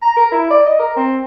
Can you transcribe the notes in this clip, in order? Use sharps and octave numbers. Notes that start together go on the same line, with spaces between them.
A#5
A#4
E4
D5
D#5
A#4
C4